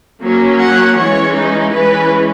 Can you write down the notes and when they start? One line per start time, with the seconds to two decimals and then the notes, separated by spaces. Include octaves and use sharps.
0.23 F#3 A#3 C#4
0.61 F#5
0.98 E3 G#3 C#4 C#5
1.36 D#4
1.73 E3 G#3 C#4 B4